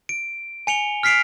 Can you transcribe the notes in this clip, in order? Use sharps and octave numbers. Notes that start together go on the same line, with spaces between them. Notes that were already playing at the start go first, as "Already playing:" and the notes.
D7
G#5 C#7 F7 G7
F6 B6 C7 D7 F7